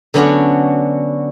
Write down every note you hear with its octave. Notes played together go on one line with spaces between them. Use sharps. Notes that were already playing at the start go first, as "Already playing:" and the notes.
D3 F#3 B3 C#4 D4 F#4